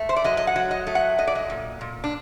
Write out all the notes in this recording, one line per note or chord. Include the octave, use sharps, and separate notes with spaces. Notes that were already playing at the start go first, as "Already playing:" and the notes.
Already playing: A3
C5
D5
F#3 D#5
D#5
F#5
F#3
D#5
A3
F#5
F#3 D#5
D5
D#5
A#2
A#2
D4